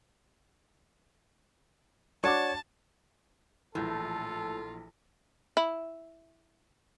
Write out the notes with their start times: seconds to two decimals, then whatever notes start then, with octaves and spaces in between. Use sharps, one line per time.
2.24 D4 F#4 C#5 A5 D6
3.75 A#1 A2 E3 F4 A4
5.57 E4